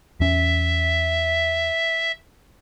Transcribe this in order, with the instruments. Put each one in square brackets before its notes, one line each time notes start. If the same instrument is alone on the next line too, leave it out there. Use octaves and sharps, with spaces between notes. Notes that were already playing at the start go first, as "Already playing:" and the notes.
[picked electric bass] E2 C#4 [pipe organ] E5